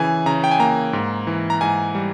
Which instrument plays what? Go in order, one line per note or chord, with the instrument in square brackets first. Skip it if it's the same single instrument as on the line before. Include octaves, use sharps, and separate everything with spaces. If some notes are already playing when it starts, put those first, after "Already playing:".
Already playing: [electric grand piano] C#3 E3 G#5
C#3 A#5
G5
G#5
A#3 A#5
G#2
E3
A#5
G#2 G#5
G3